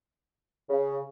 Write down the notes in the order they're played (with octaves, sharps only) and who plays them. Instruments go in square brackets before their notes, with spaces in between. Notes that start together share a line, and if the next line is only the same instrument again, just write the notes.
[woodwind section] C#3